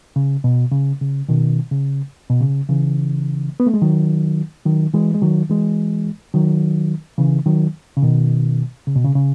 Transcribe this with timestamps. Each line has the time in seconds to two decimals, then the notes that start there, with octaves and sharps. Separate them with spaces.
0.16 C#3
0.44 B2
0.72 C#3
1.01 C#3
1.29 B2 D#3
1.71 C#3
2.30 B2
2.41 C#3
2.69 C#3 E3
3.60 B3
3.67 A3
3.74 G#3
3.82 D#3 F#3
4.65 D#3 F#3
4.94 E3 G#3
5.14 G#3
5.22 D#3 F#3
5.49 E3 G#3
6.34 D#3 F#3
7.18 C#3 E3
7.46 D#3 F#3
7.97 C#3
8.02 B2 D#3
8.87 C#3
8.95 B2
9.05 C#3
9.15 C#3